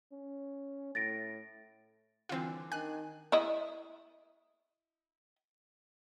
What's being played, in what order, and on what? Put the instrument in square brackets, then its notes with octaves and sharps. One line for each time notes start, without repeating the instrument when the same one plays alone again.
[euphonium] C#4
[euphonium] A2 [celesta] A6 A#6 D7
[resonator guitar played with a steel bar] D3 E3 G3 [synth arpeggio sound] C4 F4
[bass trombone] D#3 [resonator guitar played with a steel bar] D4 G#5 [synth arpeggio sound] F#6
[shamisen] E4 D#5